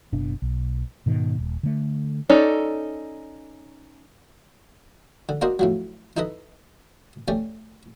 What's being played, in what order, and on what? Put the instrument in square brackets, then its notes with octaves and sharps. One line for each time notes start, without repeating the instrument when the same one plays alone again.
[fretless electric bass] F#1 B2 D4
B1
G#2 B2 D#3
D#1
D3 A3
[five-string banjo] C#4 D#4 A4 C#5 D5
[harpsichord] D3
A#3 D4 F#4 A#4 C5 D#5
A2 F3 F#3
D#4 E4 A4 B4 D#5
A3 C#4 G4 D5